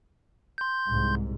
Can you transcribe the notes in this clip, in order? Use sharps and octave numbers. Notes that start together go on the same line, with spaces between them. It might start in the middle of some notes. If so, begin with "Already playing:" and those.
C6 G6
C2 G#2